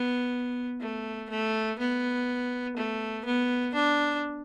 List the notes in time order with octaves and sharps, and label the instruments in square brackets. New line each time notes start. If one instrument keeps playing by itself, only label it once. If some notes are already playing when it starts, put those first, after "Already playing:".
Already playing: [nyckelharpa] B3
A3
A3
B3
A3
B3
D4